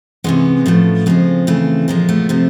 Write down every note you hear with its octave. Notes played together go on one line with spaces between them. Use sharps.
C3 E3 G#3 B3 C#4
A2 F3 A3
C#3 F3 G#3 A#3 C4
C#3 E3 A3
A#2 F3 G#3 A#3
A3 B3
C3 F3 A3